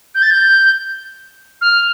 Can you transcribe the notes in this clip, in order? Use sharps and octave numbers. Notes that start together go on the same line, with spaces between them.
G6
A6
G6
F6